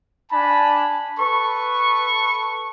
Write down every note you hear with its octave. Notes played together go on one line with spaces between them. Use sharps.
D4 G#5 A5 B5
A4 B4 C#6